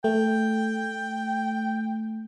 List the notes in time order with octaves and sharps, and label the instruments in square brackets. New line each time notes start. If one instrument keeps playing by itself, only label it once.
[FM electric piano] A3 [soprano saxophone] G5